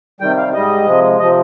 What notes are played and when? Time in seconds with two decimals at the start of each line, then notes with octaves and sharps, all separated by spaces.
0.20 C3 D#3 G3 G5
0.37 F5
0.54 G#2 G3 D#5
0.86 C3 F3 G#3
1.19 C3 F3 D#5